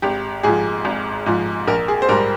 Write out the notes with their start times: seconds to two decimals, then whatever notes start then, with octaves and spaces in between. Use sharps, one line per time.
0.02 G#1 G4
0.43 G#2 F3 G#4
0.85 G#1
1.26 G#2 F3
1.67 A#1 A#4
1.88 G#4
2.02 C5
2.09 G#2 G3 A#4